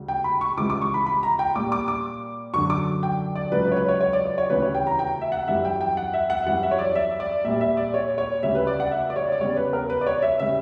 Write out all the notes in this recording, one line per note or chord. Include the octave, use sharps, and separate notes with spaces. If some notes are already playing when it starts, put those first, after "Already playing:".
Already playing: D2 C#3 G3
G5
B5
C#6
C#2 C#3 E3 G3 D6
D6
C#6
B5
B5
A#5
G5
A#2 G3 D6
D6
D6
F#2 D3 F#3 C#6
D6
G5
D5
C#2 C#3 F#3 B4
B4
C#5
B4
C#5
C#5
D5
D5
C#5
D2 C#3 E3 G3 B4
C#5
G5
A#5
G5
E5
F#5
F#2 E3 G3 E5
G5
G5
F#5
E5
F#5
E5
F#2 E3 G3 F#5
E5
C#5
D5
E5
D5
A#2 G3 E5
E5
D5
C#5
C#5
D2 C#3 G3 E5
B4
D5
F#5
E5
D5
C#5
D5
E2 C#3 G3 C#5
B4
A#4
B4
D5
C#5
E5
C#3 G3 E5